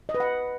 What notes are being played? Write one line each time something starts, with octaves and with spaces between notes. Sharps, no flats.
D#5
B4
F#5